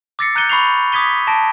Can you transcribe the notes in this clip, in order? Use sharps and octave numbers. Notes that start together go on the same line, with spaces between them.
D6 E6 A6 A#6 C7 C#7
A#5 F#6 G6 C#7 D#7 G7
B5 C#6 C7 F7
D6 D#6 G#6 B6 D#7 G7
A5 A#6 D7 D#7